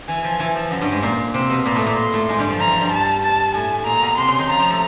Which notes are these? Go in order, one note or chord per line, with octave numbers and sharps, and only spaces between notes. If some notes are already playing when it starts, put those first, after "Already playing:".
E3 G#5
F3
E3
F3
F#2 F#3
G2 G3
G#2 G#3
A#2 A#3
C3 C4
B2 B3
A#2 A#3 B5
A2 A3
A#2 A#3
C6
A2 A3
G#2 G#3
G2 G3
F3
E3 A#5
F3
G2 G3
A5
A5
A2 A3 G#5
A#2 A#3 A#5
B2 B3
C3 C4 C6
C#3 C#4
D#3 D#4
F3 F4 A#5
F3 F4
A3 A4